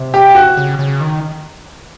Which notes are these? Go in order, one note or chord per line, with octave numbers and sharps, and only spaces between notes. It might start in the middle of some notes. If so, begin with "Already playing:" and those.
Already playing: C3
G4
F#4
C#3
C#3
D#3